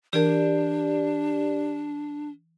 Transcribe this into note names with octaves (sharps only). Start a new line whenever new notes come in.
E3 D4 G4 A#4 D5